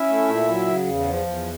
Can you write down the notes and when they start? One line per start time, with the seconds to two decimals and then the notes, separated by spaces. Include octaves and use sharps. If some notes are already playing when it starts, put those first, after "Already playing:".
Already playing: C#4 E4 E5
0.09 A3
0.29 A#2
0.49 F#3
0.67 C#3
0.87 E2
1.07 F3
1.27 E2